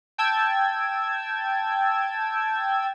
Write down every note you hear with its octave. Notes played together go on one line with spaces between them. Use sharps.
G5 A5 E6 G#6